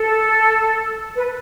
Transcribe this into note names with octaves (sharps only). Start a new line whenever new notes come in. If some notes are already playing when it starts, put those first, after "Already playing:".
Already playing: A4
B4